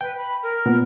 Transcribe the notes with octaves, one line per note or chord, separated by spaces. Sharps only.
B4 G5
B5
A#4
A#2 B3